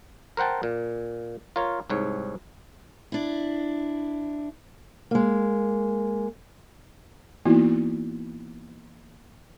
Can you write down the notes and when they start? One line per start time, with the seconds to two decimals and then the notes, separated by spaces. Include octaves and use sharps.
0.37 A#4 C5 F#5 G5 A5
0.63 A#2
1.56 F4 A#4 C#5
1.90 C2 G#2 C#5
3.12 D4 E4
5.11 G#3 A#3
7.45 E3 A#3 B3 D#4 E4 F#4